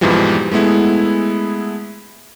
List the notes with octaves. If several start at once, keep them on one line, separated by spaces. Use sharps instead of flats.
F2 G#2 B2 E3 F3 G3
G#3 A3 B3 E4 G#4